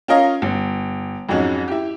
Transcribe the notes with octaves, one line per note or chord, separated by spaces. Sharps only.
C#4 F4 A#4 C#5 D#5 F5
G1
F2 G#2 F#3 G#3 C#4
E4 G4